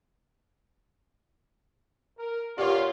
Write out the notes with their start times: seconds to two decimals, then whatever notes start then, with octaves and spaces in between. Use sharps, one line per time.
2.18 A#4
2.58 A#2 F4 G4 B4 C#5 D5 F#5